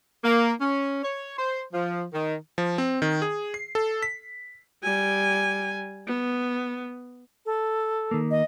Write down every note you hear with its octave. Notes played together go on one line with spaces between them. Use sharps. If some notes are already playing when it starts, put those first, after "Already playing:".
A#3
C#4
C#5
C5
F3
D#3
F3
C4
D#3
G#4
C7
A4
B6
G3 G#5
B3
A4
D#3 A#3
D#5